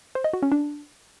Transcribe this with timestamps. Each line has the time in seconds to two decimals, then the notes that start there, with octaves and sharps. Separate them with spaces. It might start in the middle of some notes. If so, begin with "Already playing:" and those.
0.15 C5
0.24 D#5
0.33 F#4
0.43 C#4
0.52 D4